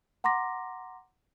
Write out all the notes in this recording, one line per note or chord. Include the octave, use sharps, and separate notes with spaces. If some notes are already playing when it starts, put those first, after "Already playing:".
F#5 A#5 C6 D6 A#6